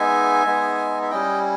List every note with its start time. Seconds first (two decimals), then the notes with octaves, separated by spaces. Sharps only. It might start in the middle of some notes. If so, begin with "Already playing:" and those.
Already playing: G#3 B3 D#4 E5 G#5
0.46 G#3 B3 D#4
1.02 E5
1.11 G3 C#4 E4 D#5 G5